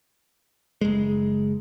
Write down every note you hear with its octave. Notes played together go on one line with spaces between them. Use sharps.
F#1 G#3